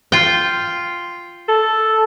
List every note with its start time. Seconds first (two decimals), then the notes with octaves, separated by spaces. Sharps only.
0.12 F4 G5
1.49 A4